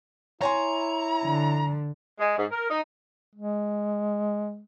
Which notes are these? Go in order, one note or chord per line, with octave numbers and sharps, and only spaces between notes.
E4 C#5 G#5 A#5 C6
D3
G#3
G#2
A#4
D#4
G#3